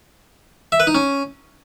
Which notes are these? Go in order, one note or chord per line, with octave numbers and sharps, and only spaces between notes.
E5
B4
D#4
C#4